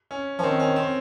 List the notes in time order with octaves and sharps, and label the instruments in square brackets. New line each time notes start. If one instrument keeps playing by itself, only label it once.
[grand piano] C#4
[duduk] F3 [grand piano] C#4
[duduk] D#3 [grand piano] C4
[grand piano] C#4
C4